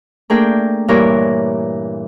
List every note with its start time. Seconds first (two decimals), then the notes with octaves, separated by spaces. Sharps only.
0.30 A3 A#3 D4 G#4 A#4 G5
0.88 G2 A#2 E3 E4 A#4 C#5